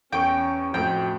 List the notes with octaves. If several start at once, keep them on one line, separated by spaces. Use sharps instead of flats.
E2 C#4 G5 C#6 D7
F2 A2 F#4 G5